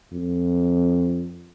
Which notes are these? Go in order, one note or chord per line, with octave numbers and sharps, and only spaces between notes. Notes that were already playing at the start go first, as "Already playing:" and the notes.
F2